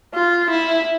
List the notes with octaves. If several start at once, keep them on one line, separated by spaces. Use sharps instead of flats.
F4
E4